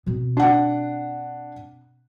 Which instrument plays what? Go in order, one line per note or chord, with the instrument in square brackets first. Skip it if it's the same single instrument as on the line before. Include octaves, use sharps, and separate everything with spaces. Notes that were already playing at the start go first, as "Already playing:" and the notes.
[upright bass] B2 C4
[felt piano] D4 F#5